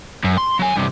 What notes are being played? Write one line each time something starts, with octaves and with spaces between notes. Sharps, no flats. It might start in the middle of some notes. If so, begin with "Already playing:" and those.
F#2
C6
F#3 G#5
G2 C3